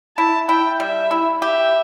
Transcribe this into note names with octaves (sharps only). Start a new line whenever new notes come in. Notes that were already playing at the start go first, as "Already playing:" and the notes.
E4 A5
E4 G5
G3 E5
E4
G4 E5